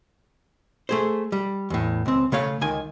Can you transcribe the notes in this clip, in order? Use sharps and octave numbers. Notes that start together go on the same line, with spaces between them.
A3 G#4 C5
G3
E2 A2
C#2 C4
C#3 A3 C#5 F5
C#2 D#3 G#5